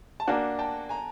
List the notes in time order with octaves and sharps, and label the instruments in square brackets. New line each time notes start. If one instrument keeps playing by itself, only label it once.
[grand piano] A5
[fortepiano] A#3 D4 F#4 [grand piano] F#5 G#5
[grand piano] G5 A5
G#5 A#5